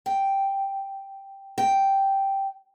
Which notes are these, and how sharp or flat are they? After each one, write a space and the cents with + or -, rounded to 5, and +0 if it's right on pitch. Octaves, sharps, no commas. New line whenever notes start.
G5 +0
G5 -5